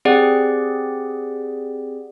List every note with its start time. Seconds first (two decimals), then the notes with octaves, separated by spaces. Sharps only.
0.05 C4 G4 G#4 D5 F#5